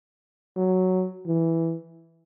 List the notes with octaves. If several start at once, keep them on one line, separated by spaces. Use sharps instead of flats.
F#3
E3